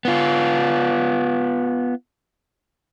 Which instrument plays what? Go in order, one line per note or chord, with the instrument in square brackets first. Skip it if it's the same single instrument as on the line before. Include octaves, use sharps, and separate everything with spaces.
[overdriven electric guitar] B3 F4